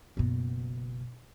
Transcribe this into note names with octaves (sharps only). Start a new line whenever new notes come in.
F#1 B2